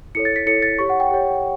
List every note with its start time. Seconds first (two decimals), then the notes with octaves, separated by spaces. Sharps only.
0.15 E4 A4 C#5 C#7
0.25 A6
0.36 B6
0.46 E4 A4 C#5 C#7
0.62 A6
0.79 G4 C#5 C#6
0.90 F#5
1.00 G5
1.11 G4 C#5